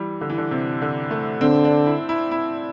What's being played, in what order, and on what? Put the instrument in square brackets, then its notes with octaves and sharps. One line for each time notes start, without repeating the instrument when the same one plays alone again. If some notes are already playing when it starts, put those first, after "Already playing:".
Already playing: [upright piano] E3 G3
D3
E3
D3
C3
D3
A3
[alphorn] D3 [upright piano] C4
[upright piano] D4
E4
E4
E4